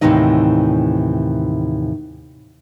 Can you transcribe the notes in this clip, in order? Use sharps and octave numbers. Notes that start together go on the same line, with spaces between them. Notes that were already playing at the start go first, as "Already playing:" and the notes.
D#2 A2 C3 E3 D#4 D#5